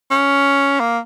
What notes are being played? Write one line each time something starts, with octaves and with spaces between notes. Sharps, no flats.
C#4
A#3